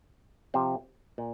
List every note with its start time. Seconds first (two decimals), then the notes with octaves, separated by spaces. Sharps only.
0.54 C3 F3 C4
1.18 A#2